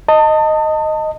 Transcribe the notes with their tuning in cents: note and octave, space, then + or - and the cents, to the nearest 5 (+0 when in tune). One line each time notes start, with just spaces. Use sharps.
D#5 +0 A5 +30